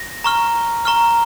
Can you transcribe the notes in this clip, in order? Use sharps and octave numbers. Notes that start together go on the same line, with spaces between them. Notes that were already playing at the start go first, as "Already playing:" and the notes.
Already playing: A#6
A#5 C#6 F6
A#5 C#6 F6